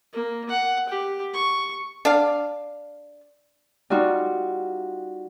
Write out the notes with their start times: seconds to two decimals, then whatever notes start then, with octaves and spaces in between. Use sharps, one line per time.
0.13 A#3
0.49 F#5
0.88 G4
1.34 C#6
2.05 D4 F5
3.90 G3 D#4 F4 F#4